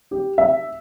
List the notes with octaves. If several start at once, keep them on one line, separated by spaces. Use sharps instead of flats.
G4
E5